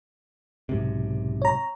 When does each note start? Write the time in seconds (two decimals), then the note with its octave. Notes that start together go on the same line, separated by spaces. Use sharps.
0.69 B1 G#2 C3
1.42 C#5 A#5